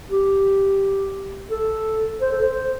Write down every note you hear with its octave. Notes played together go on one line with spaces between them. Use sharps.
G4
A4
C5
A4
C5